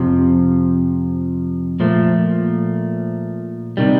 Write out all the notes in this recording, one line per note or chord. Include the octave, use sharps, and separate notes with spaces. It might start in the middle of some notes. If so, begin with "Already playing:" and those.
Already playing: F2 C3 F3
A#2 F3 A3
C3 D#3 G3